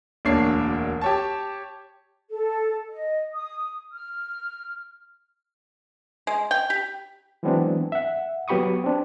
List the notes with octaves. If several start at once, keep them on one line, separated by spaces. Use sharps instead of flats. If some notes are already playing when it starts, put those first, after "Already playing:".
E1 D2 A#3 D4 C#5 C7
G4 C#5 A5
A4
D#5
D#6
F6
G#3
G5
G4
E3 F#3 G#3 B3 C4 D4
E5 F#5
F#3 B3 G4 B5 C#6 D#6
C4 D4